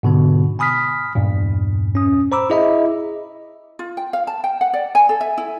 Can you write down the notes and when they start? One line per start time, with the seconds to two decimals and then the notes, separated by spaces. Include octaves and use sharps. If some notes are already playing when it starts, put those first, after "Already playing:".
0.03 G#2 B2 D3 B3
0.59 G#5 B5 D#6 F6 B6
1.15 E2 G2 A#2
1.95 C#4 D#6
2.32 C5 A#5 B5 D6 E6
2.50 E4 G#4 D#5 E5 B5
3.79 F4
3.97 G5
4.13 F5
4.27 A5
4.44 G5
4.61 F#5
4.73 D5
4.95 G#5
5.09 A4
5.21 E5
5.38 E4